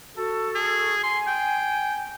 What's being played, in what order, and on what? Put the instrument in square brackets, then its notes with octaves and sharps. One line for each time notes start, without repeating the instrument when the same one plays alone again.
[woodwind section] F#4 A4
[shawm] G#4
[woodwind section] G#5 [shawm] C6
[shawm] G5